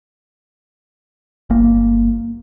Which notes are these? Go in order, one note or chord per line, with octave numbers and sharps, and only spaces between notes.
G1 A#3